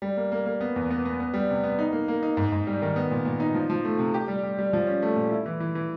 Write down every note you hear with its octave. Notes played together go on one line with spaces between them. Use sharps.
G3
A#3
A#3
A#3
B3
E2
B3
B3
B3
G3
C3
B3
D#4
A#3
A#3
D#4
G#2
G#2
G3
D#3
B3
A#2
A#2
D#4
F3
F3
A3
C3
G4
G3
G3
G3
F3
C#4
A3
A#2
E4
E3
E3
E3